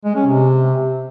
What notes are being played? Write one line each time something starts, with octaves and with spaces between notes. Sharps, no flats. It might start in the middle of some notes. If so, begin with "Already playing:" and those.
G#3
C#4
C3